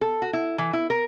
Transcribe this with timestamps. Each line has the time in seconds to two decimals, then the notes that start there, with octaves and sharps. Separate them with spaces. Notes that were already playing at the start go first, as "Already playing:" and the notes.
0.01 A4
0.22 F#4
0.33 E4
0.58 E3
0.73 E4
0.90 A#4